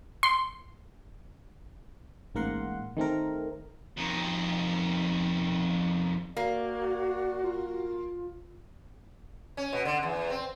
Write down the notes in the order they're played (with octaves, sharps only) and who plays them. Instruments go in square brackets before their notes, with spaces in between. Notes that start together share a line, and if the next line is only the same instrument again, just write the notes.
[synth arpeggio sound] C6
[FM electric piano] A1 G#2 A#3 A#4 F#5 C6
D#3 A3 C4 A#4
[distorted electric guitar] F2 D#3
[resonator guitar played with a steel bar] A#3 [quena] F#4 [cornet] D5
[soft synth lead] F4 [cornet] A#4
[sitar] C#4
B2
D3
E2
C4